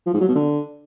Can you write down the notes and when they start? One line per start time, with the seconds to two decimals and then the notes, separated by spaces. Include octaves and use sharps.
0.06 F3
0.14 G#2
0.21 F#3
0.28 B2
0.35 D3